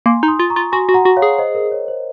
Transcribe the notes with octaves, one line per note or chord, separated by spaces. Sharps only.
A#3 G#5 C6
D#4
C6 D#6
F4
A#5 C#6
F4
F#4 G#5 C6
F#4
F#5 A#5
F#4
C#5 F5
G#4
C5 D#5
A#4
C#5
C5